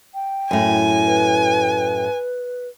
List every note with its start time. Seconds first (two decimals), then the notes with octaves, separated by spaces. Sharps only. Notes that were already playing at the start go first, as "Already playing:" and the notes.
0.14 G5
0.51 F#2 A2 G#5
1.07 B4